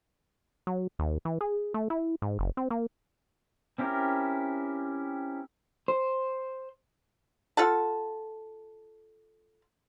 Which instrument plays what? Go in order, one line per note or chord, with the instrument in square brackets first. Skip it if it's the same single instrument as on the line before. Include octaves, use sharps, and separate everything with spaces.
[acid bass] F#3
D#2
E3
G#4
A3
E4
G#2
F#1
C4
A#3
[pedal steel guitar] C4 C#4 E4 G4 A#4
[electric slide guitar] C5
[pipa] F4 A4 F#5 A5